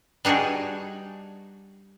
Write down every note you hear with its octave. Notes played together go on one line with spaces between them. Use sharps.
G3 D4 D#4 F#4 G#4